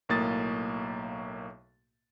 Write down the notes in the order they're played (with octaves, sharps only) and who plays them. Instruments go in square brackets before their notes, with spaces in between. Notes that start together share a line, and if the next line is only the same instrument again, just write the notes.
[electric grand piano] B1 A2 A#3 D#6 A6